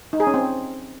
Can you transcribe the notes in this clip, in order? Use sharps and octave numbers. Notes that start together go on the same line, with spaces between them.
D#4
G#4
C#4
C4